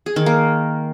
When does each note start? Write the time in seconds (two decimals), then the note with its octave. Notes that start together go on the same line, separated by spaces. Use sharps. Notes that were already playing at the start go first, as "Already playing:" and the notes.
0.06 G#4
0.16 D#3
0.26 A#3